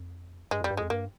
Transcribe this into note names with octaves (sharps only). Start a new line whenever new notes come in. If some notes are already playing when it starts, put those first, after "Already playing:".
Already playing: F2
G2 G#3
F2 G3
G2
F2 G#3
G2 A#3